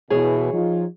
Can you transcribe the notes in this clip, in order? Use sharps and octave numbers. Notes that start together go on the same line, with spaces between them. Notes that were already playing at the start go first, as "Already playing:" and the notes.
B2 E3 G#4 C#5
F3 D#4 F4